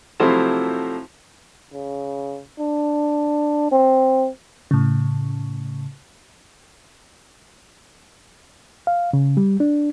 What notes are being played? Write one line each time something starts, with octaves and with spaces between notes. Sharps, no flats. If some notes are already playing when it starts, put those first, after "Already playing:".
C3 F3 F#3 A3 E4 C5
C#3
D4
C4
A2 C#3
F5
C#3
G3
D4